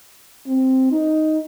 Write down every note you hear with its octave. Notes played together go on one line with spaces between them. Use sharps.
C4
D#4